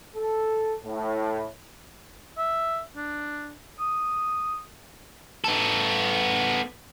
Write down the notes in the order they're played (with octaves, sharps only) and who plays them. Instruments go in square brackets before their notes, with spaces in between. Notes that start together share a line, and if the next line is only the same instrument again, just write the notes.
[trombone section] A4
A2
[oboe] E5
D4
D#6
[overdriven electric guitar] B3 A4